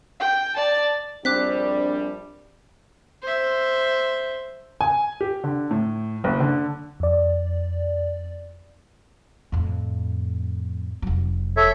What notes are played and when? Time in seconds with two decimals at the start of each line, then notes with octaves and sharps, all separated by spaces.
0.20 G5
0.57 D5 A5
1.25 A#1 G3 C4 D4 D6 F#6 B6
3.23 C5 E5
4.81 G#5
5.21 G4
5.44 D3
5.71 A2
6.24 F#1
6.40 D3
7.00 F2 D5
9.52 F2 A2
11.02 F1 F#3
11.57 A4 C#5 E5